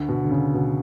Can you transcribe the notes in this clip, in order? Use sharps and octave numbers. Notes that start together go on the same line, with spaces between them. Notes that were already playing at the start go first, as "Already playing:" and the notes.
Already playing: D2 D3
B2
D3
C#3
B2